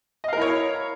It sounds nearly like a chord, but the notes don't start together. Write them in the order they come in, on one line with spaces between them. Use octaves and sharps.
D#5 F5 A#4 E4 C#5